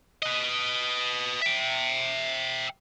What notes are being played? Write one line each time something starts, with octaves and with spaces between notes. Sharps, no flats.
B4 D#5
E5 G5